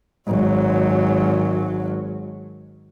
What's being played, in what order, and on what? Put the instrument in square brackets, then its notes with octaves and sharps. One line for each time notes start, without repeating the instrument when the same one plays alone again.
[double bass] G#1 F#3